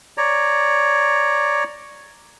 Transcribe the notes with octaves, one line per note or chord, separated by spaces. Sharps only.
C#5 D5 A#5